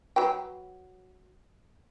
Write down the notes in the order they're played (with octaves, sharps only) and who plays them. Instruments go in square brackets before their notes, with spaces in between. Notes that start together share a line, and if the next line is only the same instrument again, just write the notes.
[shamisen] F#3 B4 G5